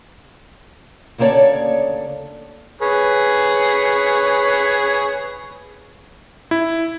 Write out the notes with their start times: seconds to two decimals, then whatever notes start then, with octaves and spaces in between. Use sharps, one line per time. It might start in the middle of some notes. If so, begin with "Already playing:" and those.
1.18 D2 C#3 A#3 A4 C#5 D5
2.82 G#4 B4 C#5
6.51 E4